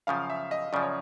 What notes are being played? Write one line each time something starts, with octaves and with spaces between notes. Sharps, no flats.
F#2 C#3 F3 F5
E5
D#5
F#2 C#3 F3 D5
C#5